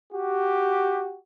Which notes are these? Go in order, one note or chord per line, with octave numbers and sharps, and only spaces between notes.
F#4 G4